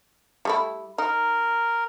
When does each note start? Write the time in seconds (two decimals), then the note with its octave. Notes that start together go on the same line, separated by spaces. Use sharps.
0.45 G3 A3 E4
0.98 D#4 A#4